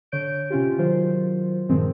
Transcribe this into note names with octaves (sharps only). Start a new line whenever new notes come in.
D3 C#5 G6 D7
C3 C#4 F4 G4
D#3 F#3 F4 C5
G2 A#2 D#3 F3 G#3 C4